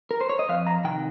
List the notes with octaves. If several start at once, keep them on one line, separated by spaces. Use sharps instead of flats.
A#4
C5
C#5
D#5
F2 F5
A#5
C3 D#3 G5